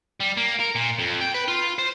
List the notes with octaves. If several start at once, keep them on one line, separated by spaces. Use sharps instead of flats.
G3
A#3
A#4
A#2
F2
G5
B4
F4
C5